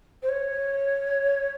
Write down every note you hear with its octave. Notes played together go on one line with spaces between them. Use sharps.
C5
C#5